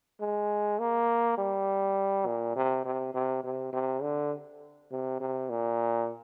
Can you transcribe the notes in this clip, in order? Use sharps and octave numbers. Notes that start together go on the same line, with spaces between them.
G#3
A#3
G3
A#2
C3
C3
C3
C3
C3
D3
C3
C3
A#2